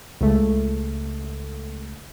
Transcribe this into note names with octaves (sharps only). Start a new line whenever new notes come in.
C#2 A3